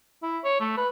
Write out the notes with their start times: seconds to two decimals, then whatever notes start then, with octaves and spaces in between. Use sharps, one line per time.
0.23 E4
0.44 C#5
0.60 A3
0.77 B4